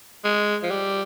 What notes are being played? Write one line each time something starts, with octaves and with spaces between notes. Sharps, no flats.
G#3
F3
G3